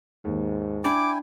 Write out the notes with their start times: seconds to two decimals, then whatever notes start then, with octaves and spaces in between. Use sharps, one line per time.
0.25 D#2 G#2
0.84 D4 E4 G5 G#5 D6